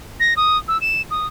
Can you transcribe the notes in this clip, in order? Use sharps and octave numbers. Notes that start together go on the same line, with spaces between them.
A#6
D#6
E6
E7
D#6